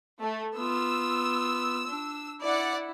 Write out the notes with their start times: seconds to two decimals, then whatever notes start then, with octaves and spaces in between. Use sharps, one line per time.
0.20 A3
0.56 B3 F4 E6
1.88 D4
2.42 E4 D5 F#5